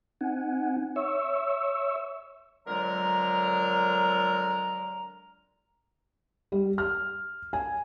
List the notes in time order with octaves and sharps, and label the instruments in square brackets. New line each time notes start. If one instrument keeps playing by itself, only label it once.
[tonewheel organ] C4 D#4 F#5 G#5
C#5 E5 C#6 E6
[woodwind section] F2 D3 F#3 G#3 A#4 A#5
[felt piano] G3
F6
G#5